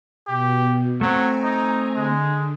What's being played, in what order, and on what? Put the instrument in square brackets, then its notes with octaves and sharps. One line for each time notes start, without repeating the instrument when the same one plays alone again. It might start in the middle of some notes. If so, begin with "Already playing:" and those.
[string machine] B2 [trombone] G4
[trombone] F#3 [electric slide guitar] A3 C4 [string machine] G#5 A#5
[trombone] D#4
[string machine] D3 [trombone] G#3